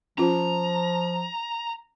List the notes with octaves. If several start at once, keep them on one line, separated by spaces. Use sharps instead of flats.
F3 C#4 F4 A#5